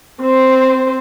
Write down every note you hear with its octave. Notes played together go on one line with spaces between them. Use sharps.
C4 C5